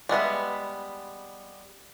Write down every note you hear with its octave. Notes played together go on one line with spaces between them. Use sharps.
G3 G#3 B3 E5